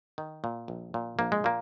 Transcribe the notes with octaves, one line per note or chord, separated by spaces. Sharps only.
D#3
A#2
A#1
A#2
A#1 A#3
G#3
A#2 A#3